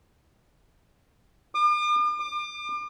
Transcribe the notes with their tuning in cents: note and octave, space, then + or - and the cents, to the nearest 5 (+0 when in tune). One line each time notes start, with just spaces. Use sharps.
D6 +45
D6 +35